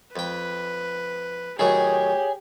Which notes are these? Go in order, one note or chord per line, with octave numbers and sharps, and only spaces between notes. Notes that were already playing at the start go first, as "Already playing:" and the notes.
F2 B4 G5
A2 D#3 F#3 G4 G#4 C#5